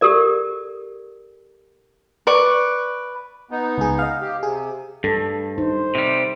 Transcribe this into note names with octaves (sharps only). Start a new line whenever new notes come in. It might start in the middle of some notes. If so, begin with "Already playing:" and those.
G4 A4 A#4 D5
B4 D5 C#6
B3 D#4
C#2 G#4
D#5 F5
G4
C3 G#4
G2 A4
D#4 C5
C3 G3